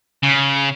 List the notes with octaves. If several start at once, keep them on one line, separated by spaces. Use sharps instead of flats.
C#3